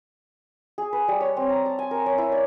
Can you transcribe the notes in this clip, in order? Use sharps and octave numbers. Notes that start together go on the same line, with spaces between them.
G#4
B4
G3
C#5
C4
A#5
A5
G#5
A#4
C#5
E4
D5